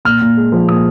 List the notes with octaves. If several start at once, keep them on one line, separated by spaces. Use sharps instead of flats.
A#2 F6
A#2
G#3
F3
A#2 D#6